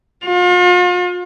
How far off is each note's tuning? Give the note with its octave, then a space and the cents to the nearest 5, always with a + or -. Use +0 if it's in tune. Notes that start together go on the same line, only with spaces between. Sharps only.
F4 +40